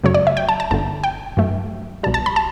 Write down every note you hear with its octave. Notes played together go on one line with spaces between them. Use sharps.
F#2 C#3 F#3 A3 C#5
D5
E5
G5
A5
A5
G1 G2 D3 A5
G5
G2 F#3 A3
B1 B2 G3 A5
A5
B5
A5